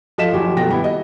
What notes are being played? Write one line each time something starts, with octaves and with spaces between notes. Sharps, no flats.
F3 A4 D#5 F5 B6 E7
F#1 D#3 F3 F#4 G4 G#5
B2 D#3 A4 G5 A#6
G3 B3 E4
D#5